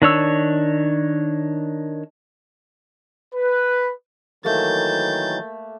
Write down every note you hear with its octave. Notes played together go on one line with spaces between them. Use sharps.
D#3 D4 C#5 E6
B4
D#3 E3 F#3 A3 A#3 G6 A6